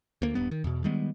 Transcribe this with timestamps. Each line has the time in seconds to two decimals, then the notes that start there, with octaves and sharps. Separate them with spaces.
0.22 D2 A#3
0.35 D#1 G2 B3
0.51 D#3
0.64 E2 B2
0.84 D#3 G3 G#3 B3